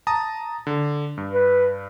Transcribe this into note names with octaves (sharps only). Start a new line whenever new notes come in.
A5 A#5 D#6
D3
G2
B4